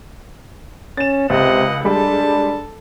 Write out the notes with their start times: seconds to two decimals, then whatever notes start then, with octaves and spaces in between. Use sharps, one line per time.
0.97 C#4 A6 E7
1.30 C#2 C3 D#5 F#5
1.85 G3 G#3 D4 A4 A5